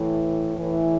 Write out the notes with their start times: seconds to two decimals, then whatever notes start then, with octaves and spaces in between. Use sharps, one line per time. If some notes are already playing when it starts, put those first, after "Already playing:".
Already playing: A2 E3
0.57 A2 E3